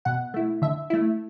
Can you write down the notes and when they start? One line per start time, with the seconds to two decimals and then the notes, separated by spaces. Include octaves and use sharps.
0.05 B2 F#5
0.34 A3 E4
0.62 D3 E5
0.90 A3 E4